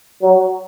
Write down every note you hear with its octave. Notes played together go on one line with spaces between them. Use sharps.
F#3